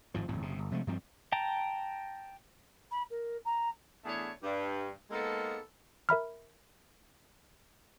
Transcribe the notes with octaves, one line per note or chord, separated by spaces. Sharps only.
G#1 G#2 F3
D1 G#1 F2 A2
F#1 C3
G1
C3 F3 G#3 A3
G2 F3 C4
G5 A5 A#5
B5
A#4
A#5
E2 A3 B3 D4 G#4 C#5
G2
G#3 A#3 B3 D#4 A4
A#4 E5 B5 F6